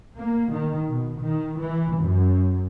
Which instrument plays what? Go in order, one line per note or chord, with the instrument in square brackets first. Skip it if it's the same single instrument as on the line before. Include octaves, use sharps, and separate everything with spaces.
[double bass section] A#3
D#3
B2
D#3
E3
F#2